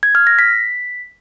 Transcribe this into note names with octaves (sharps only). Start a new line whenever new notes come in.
G#6
F6
A#6
B6